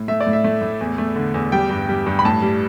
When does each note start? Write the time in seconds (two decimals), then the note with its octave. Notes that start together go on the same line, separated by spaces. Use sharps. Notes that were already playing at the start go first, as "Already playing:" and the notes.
Already playing: A2
0.08 A3 E5
0.20 D5
0.27 A2
0.33 E5
0.44 A3
0.62 A2
0.81 E2
0.98 A3
1.16 D3
1.34 E2
1.52 G3 G5
1.70 G2
1.89 G3
2.06 G2
2.19 B5
2.25 A2 A5
2.42 G3